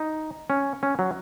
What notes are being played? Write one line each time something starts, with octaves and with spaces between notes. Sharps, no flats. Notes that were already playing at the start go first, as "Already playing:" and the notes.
Already playing: D#4
C#4
C#4
F#3